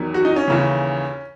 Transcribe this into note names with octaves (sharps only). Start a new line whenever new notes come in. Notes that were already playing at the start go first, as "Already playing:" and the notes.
Already playing: E2 D#3 F#3
F#4
D#4
C#4
D#2 C#3 E3